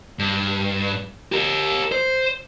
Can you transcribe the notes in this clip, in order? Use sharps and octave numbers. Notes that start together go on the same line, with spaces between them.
G2
G4 A#4
C5